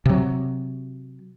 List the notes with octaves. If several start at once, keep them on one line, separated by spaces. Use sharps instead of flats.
C3 F#3